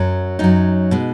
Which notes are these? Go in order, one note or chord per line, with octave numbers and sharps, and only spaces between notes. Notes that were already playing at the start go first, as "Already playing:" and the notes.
Already playing: F#2 F#3
F#2 F#3 D#4
B2 G#3